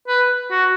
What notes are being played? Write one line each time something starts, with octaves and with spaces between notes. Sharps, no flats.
B4
F#4